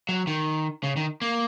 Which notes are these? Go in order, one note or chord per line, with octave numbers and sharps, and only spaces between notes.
F#3
D#3
C#3
D#3
A#3